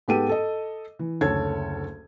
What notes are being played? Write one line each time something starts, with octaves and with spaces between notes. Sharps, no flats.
G#2 B3 G4 A4 D#7
A4 D#5
E3
F#1 D2 A4 C#5 G#6